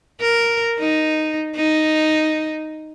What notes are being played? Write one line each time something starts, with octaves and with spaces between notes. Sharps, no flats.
A#4
D#4
D#4